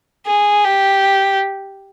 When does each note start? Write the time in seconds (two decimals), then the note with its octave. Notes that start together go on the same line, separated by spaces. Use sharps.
0.27 G#4
0.65 G4